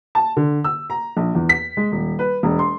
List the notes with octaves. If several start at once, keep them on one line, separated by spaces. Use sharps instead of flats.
A5
D3
E6
A#5
A#1
E2
B6
G#3
D#1
B4
E1
C6